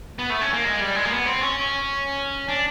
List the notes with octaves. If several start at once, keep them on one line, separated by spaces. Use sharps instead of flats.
B3
A3
C#4
A#3
G#3
G3
G#3
A#3
B3
C4
C#4
D4